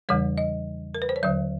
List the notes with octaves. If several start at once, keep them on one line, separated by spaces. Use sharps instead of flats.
E2 C#3 E3 G3 C#5
D#5
A#4
B4
C5
C#5
D#2 D3 F#3 D5